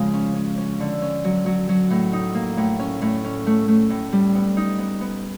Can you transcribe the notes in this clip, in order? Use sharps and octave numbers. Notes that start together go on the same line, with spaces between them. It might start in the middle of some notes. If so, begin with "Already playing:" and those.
Already playing: C#3 F3 G#3
C#4
C#4
C#4
D3
C#4
F#3
F#3
F#3
A2
D#4
A#3
A2
C#4
A2
C#4
A3
A3
A2
G3
B3
D#4
B3
B3